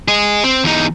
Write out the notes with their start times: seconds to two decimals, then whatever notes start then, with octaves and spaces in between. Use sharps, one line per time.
0.08 G#4 D#5
0.44 C4
0.64 E2 D#4